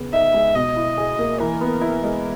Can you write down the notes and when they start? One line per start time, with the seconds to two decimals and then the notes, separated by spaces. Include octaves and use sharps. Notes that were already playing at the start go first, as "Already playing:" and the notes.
Already playing: C#3 B3
0.13 D#4 E5
0.34 G#3
0.55 B2 D#5
0.76 E4
0.98 G#4
1.19 A#3
1.40 E3 A#4
1.61 B3
1.81 E4
2.03 G#3